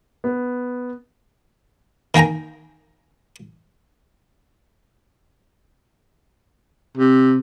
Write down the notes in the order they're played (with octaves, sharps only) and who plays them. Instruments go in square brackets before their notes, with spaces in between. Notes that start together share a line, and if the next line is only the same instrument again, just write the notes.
[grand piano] B3
[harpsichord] D#3 A#3 G5 G#5 A#5
[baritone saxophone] C3